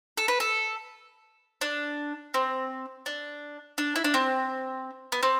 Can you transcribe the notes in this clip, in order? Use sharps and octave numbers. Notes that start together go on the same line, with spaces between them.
A4
B4
A4
D4
C4
D4
D4
E4
D4
C4
B3
C4